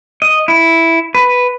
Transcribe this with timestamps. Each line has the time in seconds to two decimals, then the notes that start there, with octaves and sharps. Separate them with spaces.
0.22 D#5
0.48 E4
1.15 B4